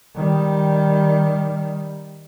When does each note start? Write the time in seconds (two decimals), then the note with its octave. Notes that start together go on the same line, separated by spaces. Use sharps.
0.15 D#3 G3